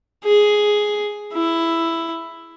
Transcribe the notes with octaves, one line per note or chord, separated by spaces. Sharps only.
G#4
E4